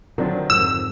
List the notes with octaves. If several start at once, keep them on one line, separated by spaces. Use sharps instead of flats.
D3 D#3 F3 F#3 C4 D4
F2 G#2 D3 E6